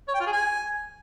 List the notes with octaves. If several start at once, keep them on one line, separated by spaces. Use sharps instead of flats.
C#5
G5
F4
G#4
G#5